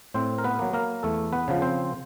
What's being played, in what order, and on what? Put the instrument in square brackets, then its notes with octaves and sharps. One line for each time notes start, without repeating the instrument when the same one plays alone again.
[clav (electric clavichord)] A2 C4 C5
A#4
B3 B4
F#3 A#3
A#3 A#4
E2 A3 A4
B3 B4
C#3 F3
C4 C5